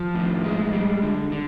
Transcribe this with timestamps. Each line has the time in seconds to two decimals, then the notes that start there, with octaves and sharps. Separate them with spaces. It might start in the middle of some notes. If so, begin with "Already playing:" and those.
Already playing: F3
0.15 A2
0.44 G#3
0.73 G3
1.02 D3
1.32 D3